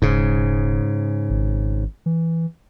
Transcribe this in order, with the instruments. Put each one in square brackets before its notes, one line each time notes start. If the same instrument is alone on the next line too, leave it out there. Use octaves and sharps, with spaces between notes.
[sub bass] E1 [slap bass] G#2 C#3
[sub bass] G#1
E3